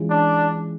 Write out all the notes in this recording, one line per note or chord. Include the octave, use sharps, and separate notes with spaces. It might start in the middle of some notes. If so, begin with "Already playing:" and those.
Already playing: E3 G#3 C#4 F4
D4